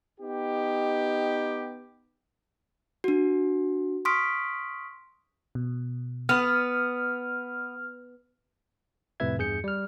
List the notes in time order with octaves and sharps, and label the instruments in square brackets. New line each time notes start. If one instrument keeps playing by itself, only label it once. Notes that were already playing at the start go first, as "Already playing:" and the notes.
[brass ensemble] B3 D#4 G4
[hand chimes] D4 F#4
C6 C#6 D#6 F6 B6 D7
[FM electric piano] B2
[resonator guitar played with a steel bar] B3 [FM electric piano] F6
[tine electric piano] F2 A2 C3 B4 E5 G#6
E2 G2 G#4 G6 C#7
G3 F6